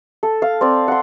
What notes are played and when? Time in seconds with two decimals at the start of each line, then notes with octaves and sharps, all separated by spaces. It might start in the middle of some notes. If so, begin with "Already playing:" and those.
0.23 A4
0.42 F5
0.61 C4 D5
0.88 F#5 C6